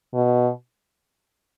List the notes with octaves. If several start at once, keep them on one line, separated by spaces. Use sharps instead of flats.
B2